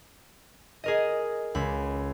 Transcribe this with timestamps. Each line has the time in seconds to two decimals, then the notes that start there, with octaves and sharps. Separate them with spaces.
0.84 G#4 A#4 D#5
1.55 C#2 B5